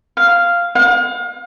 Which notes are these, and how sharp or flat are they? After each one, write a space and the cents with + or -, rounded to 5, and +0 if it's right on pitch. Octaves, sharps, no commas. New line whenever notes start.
F5 -5
F5 +35